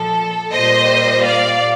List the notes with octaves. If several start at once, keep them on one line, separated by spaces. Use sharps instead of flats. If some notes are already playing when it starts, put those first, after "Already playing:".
Already playing: A#2 F3 A4
A#2 G3 C5 D#5
D5 F5